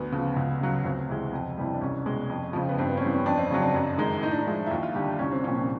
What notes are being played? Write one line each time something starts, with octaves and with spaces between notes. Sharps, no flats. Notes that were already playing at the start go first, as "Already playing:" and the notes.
Already playing: D2 B3
C#3 F3
C#2
C#3 F#3
D2 C4
C3 E3 G#3
F2
C3 E3 G3
D4
C2 C#4
B2 G#3
F2
C#3 F3
B3
G2 C4
B3
C#4
E3 G3 C4
C#4
F2 D4
C4
C#3 F#3 C#4
D4
F#2
D#3 G#3
A2 D#4
D4
D#4
F3 G#3 E4
E4
D#2 F4
F4
D3 G3 G4
D4
C2 C#4
C4
A#2 F3 C#4
C#4